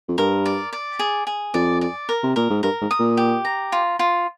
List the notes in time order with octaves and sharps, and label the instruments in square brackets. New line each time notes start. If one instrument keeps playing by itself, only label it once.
[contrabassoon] F2
[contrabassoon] G2 [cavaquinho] A#4
[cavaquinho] D5
D5
G#4
G#4
[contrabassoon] F2 [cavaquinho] D5
[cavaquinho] D5
A#4
[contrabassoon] C3
[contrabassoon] A#2 [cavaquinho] A#4
[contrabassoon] G#2
[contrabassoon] G2 [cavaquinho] A#4
[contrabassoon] G#2
[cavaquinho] D#6
[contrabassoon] A#2
[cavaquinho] G4
A#5
F4
F4